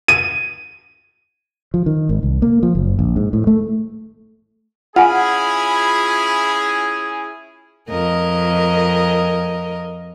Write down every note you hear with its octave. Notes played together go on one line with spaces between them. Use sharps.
D#7
F3
D#3
G#1
C2
A#3
F3
F#1
A#1
G#2
A2
A3
C#4 E4 F4 G#4 F#5 G#5 B5
F2 A#4 D#5